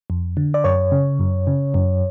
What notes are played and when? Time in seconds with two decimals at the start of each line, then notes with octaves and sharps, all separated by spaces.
0.10 F2
0.37 D3
0.54 D5
0.64 F#2 C#5
0.92 C#3
1.19 F#2
1.47 C#3
1.74 F#2